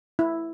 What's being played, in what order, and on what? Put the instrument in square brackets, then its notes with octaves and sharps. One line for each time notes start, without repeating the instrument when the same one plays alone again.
[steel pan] E4